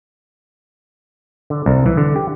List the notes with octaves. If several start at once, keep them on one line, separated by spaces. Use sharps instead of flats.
D3
C2
E3
D3
G4